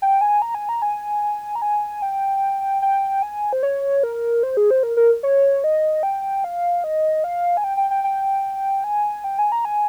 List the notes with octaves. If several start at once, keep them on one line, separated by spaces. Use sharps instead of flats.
G5
G#5
A#5
G#5
A#5
G#5
A#5
G#5
G5
G5
G#5
C5
C#5
A#4
C5
G#4
C5
A#4
A#4
C#5
D#5
G5
F5
D#5
F5
G#5
G5
G5
G5
G5
G#5
G5
G#5
A#5
G#5